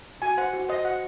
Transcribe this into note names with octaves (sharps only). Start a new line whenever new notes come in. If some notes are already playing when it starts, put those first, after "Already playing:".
F#4 G#5
C5 F#5
F#4
C5 D#5
F#4 F#5